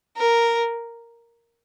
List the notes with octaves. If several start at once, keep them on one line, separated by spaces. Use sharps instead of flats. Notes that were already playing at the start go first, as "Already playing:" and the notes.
A#4